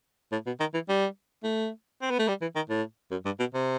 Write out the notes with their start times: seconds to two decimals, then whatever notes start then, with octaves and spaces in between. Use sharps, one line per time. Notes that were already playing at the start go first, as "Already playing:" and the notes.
0.32 A2
0.46 B2
0.60 D#3
0.74 E3
0.89 G3
1.44 A3
2.02 C4
2.11 B3
2.19 A3
2.28 G3
2.41 E3
2.56 D#3
2.69 A2
3.11 F#2
3.25 G2
3.39 B2
3.54 C3